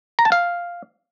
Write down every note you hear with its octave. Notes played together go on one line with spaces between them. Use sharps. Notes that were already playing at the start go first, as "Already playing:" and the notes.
A#5
A5
F5